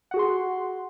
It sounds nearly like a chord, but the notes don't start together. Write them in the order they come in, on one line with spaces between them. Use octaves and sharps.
F#5 F#4 G#4 C6